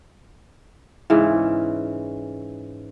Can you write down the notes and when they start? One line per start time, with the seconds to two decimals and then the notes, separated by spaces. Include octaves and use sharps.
1.10 G#2 C#3 E3